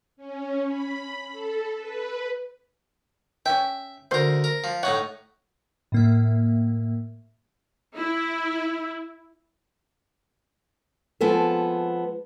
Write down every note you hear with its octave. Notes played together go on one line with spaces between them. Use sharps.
C#4
B5
A4
B4
C#4 E5 G5
D2 A#4 C5
A#4
F3
A2 D#4 C#5 F#5
A2 A#3 E5
E4
F3 G#3 B3 C4 A4